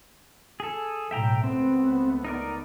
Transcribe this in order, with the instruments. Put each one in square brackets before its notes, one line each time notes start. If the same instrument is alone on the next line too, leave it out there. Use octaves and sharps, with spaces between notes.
[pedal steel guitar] G#4 A4
[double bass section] B1 A2 [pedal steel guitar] E5 G5 A#5
[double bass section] C#2 A3 B3 [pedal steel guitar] C4
[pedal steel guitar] D#4 A#4 D5